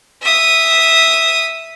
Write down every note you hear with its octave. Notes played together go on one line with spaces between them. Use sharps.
E5 D#6